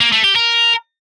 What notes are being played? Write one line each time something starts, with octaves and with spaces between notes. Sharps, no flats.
A#3
A3
G4
A#4